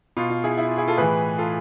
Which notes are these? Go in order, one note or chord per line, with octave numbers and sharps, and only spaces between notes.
B2 F4
F4
E4 G#4
E4
F4
E4 G#4
F4 A4
A2 E3 G#4 B4
F4 A4